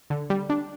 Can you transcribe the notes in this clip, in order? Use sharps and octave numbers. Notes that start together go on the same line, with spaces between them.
D3
G3
D4